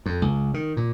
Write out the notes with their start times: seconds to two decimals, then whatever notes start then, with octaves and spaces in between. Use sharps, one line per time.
0.06 F2
0.22 C#2
0.54 D#3
0.77 A#2